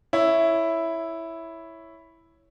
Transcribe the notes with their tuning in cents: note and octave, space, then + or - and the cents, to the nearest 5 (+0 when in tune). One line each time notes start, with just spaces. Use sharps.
E4 +0 C#5 +0